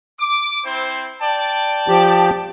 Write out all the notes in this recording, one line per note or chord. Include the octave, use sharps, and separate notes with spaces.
D6
C4 E4 C5
D5 G5 A5
F3 G4